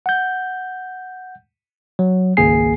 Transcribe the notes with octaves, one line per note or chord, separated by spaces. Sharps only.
F#5 G6
F#3
G#1 C#2 A#3 G#4 G#5 C7